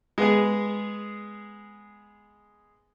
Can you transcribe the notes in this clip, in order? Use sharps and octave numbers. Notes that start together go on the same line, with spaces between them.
G#3 B3 G#4